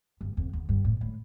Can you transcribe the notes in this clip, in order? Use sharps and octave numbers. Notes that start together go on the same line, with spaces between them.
G2
F2
E2
G2
A2
A2